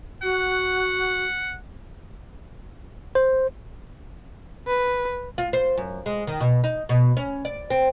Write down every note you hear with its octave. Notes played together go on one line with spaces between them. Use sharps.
F#4 F#5
C5
B4
F4
C5
F#2
G#3
D#3
B2
D#4
B2
C#4
D5
C4